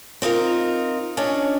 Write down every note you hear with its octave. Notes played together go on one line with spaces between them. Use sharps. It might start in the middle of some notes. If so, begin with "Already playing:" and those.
C4 D#4 F4 A#4
C#4 D4 C#5 D#5